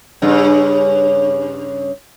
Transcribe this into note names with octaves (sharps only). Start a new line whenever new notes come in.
G2 C#3